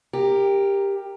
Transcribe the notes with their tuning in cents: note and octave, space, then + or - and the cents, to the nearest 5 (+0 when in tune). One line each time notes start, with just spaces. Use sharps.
G4 +15 A#4 +0